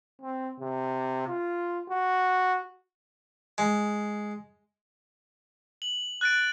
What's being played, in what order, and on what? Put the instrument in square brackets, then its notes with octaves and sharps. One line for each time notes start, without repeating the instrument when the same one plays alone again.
[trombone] C4
C3
F4
F#4
[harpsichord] G#3
[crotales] F#7
F#6 A6 D7